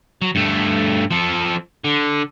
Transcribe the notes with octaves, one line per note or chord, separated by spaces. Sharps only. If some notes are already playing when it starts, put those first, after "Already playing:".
F#3
G2 A3
F3 A4
D3